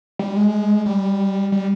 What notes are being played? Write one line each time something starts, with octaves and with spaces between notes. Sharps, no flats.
G3
G#3
G3
G3